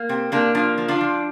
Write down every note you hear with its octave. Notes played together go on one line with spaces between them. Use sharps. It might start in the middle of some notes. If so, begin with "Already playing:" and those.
Already playing: A#3
C3 C4
C3 A#3 D4
F3 A#3 D4
F3
D4 F4
F3